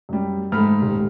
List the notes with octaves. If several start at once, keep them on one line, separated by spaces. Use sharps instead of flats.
F#2 G3
G#2 A3 B5 F6
D#1